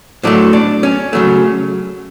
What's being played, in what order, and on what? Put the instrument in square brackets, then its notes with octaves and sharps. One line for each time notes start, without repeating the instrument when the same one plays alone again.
[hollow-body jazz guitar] A2 F#3 A3 D4
D4
C#4
C#3 F#3 A3